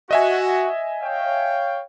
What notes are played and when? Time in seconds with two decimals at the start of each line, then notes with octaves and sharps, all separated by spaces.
0.11 F#4 D#5 E5 G#5
1.02 C#5 F5 G5